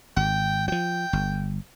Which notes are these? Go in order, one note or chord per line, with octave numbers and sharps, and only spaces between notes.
G#1 G5
F3 F#3 G5
G1